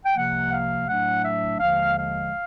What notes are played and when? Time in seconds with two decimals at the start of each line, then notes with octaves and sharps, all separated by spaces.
0.05 G5
0.16 C2 C3 F3 A#3 F#5
0.51 F5
0.87 A2 F#3 A3 D4 F#5
1.23 E5
1.59 D#2 D3 F3 G#3 F5
1.96 F5